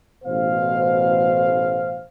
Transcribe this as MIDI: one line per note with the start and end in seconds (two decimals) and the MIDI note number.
0.24 2.03 33
0.24 2.03 47
0.24 2.03 72
0.24 2.03 77